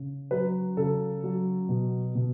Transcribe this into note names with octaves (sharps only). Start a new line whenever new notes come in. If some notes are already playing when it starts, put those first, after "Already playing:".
Already playing: C#3
F#3 B4
C#3 A4
F#3
B2
B2